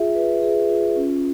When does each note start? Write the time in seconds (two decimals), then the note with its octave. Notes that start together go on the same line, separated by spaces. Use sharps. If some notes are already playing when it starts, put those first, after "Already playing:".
Already playing: F4 G#4 E5
0.15 B4
0.43 G#4
0.69 F4
0.96 C#4